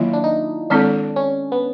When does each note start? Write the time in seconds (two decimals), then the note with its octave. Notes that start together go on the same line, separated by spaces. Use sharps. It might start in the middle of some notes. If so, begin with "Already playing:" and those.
Already playing: D#3 F#3 A#3 E4 F4
0.13 D4
0.24 D#4
0.70 D#3 G#3 C4 D4 E4 A4
1.16 C#4
1.52 B3